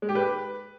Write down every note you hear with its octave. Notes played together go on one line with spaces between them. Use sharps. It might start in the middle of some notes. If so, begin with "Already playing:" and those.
G#3
G4
B4